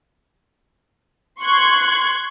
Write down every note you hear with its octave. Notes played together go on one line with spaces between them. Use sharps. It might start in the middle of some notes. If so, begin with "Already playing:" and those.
C6 C#6 F#6 G#6